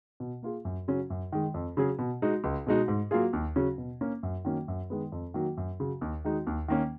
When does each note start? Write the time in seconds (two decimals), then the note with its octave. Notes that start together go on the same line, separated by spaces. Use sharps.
0.20 B2
0.42 A#3 F4 G#4
0.65 F#2
0.88 C#3 F#3 C#4
1.10 F#2
1.32 D#3 G#3
1.54 F2
1.77 C#3 F#3 C#4 G#4
1.99 B2
2.22 G#3 D#4 F#4
2.44 C#2
2.67 B2 G#3 D#4 F#4
2.88 G#2
3.11 F#3 A#3 F4 G#4
3.33 D#2
3.56 C#3 F#3 C#4 F#4
3.78 B2
4.01 A#3 C#4
4.23 F#2
4.45 D#3 F#3 A#3 C#4
4.68 F#2
4.90 D#3 G#3 B3
5.12 F2
5.34 D#3 F#3 A#3
5.57 F#2
5.80 C#3 F#3
6.01 D#2
6.24 D#3 G#3 D#4 F#4
6.47 D#2
6.68 D#3 A#3 C#4